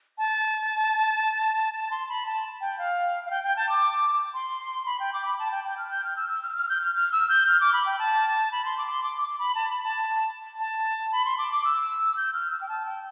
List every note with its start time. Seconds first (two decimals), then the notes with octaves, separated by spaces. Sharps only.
0.18 A5
1.74 A5
1.91 C6
2.09 B5
2.26 A5
2.61 G5
2.78 F5
3.26 F5
3.31 G5
3.44 G5
3.56 A5
3.69 D6
4.34 C6
4.86 B5
5.00 G5
5.13 D6
5.25 B5
5.39 A5
5.51 G5
5.64 G5
5.78 F6
5.91 G6
6.04 F6
6.16 E6
6.29 E6
6.42 F6
6.56 F6
6.69 G6
6.81 F6
6.95 F6
7.12 E6
7.29 G6
7.47 F6
7.61 D6
7.73 B5
7.86 G5
7.99 A5
8.52 B5
8.65 C6
8.78 D6
8.90 C6
9.04 D6
9.21 D6
9.39 B5
9.55 A5
9.70 B5
9.83 A5
10.59 A5
11.12 B5
11.25 C6
11.38 D6
11.51 D6
11.64 E6
12.17 G6
12.33 F6
12.51 E6
12.61 G5
12.69 A5
12.86 G5